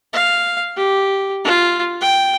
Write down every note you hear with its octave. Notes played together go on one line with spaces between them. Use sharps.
F5
G4
F4
G5